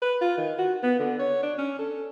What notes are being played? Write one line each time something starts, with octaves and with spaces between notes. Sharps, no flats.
B4
F4
D#3
F#4
B3
D3
C#5
D4
C#4
A4